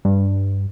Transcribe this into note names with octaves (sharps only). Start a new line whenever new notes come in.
G2